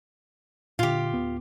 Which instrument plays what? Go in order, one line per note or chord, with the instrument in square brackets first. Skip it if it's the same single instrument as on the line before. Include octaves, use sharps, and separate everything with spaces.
[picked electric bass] A#2 D3 [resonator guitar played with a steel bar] F4 G4
[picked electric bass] D1 B3